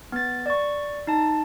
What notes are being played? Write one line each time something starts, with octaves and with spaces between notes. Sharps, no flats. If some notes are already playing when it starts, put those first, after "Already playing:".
B3 A6
D5 C#6
D#4 A5